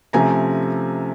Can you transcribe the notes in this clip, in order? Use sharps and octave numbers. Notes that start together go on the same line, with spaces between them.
C3 F3 A3 C#4 G#5 A#5